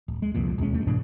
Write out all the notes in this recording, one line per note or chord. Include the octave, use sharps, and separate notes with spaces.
D1
G#3
C2 F2 A#2
E1 D#2 G#3 C#4
G2 A3
G#2 B2 E3 D4